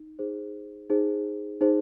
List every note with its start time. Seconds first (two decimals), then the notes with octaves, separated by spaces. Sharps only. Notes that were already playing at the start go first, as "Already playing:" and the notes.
Already playing: D#4
0.19 D#4 G#4 C5
0.90 D#4 G#4 C5
1.61 D#4 G#4 C5